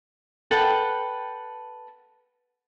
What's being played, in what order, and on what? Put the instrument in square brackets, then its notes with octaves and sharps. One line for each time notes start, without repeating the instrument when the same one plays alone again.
[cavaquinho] A4 B4 F#5 G5